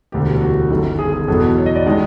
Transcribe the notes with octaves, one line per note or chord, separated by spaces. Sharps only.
E1 D2 C3 G4
F#4
F#4
G1 F#2 D#3 G3 G4
G#4
G#4
E2 B2 F#3 A4
C#5
D#5
D5
D#3 G#3